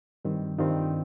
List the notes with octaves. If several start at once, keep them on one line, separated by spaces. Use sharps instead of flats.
G2 D#3 G3 C4
G2 D#3 G3 C4 D#4 F4